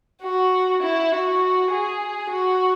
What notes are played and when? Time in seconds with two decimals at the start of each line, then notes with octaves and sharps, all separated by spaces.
0.22 F#4
0.82 E4
1.12 F#4
1.71 G#4
2.30 F#4